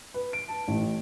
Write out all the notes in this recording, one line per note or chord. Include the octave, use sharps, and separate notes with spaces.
B4
D7
A5
A1